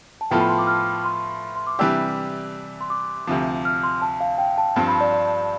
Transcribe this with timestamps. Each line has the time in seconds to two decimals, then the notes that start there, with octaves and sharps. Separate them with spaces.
0.21 A5
0.31 A2 F3 B3 F4 A4 G5
0.40 B5
0.49 C6
0.59 D6
0.67 F6
1.05 C6
1.56 C6
1.67 D6
1.79 C3 E3 G3 D4 G4 E6
2.81 C6
2.90 D6
3.27 D2 C3 F3
3.65 F6
3.83 C6
4.02 A5
4.21 F5
4.38 G5
4.58 A5
4.76 G2 F3 C4 A5
4.88 B5
5.01 D5
5.13 D5